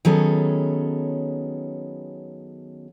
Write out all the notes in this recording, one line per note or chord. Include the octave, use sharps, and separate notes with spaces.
D#3 F#3 B3 C#4 G#4 A4